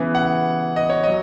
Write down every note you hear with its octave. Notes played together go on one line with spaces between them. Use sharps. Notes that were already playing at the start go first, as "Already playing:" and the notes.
Already playing: C#3 E3 B3
F#5
D#5
C#5
F#3 D#5